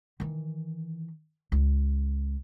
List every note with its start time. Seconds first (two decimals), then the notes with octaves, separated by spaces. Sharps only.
0.20 D#3 E3
1.52 C#2